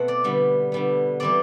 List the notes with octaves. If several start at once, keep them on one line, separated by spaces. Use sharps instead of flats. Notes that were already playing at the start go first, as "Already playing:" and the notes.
Already playing: B2 A3 C4 F#5
D5
D3 G3 B3
D3 G3 B3
E3 G3 C4 D5